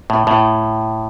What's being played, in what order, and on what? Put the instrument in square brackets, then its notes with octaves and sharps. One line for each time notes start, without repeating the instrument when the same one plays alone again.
[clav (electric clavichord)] A2
A2